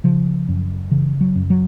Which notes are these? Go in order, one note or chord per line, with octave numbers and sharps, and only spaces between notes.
C#3 F3
F#2
C#3 E3
F#3
F#2
F#3